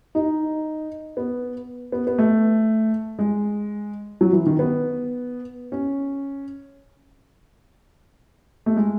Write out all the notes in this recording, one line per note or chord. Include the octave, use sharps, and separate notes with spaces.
D#4
B3
B3
B3
A3
G#3
F#3
E3
D#3
B3
C#4
A3
G#3